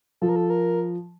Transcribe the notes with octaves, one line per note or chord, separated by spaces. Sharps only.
F3 A4
A#4
A4
A#4